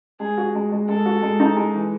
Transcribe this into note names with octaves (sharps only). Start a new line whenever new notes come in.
G#3 G#4
F#4
G#3
G#3
G#3 A4
F#4
G#3
D#4
G#3
E3